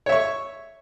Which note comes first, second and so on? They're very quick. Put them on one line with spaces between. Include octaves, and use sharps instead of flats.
C#5 E5 C#6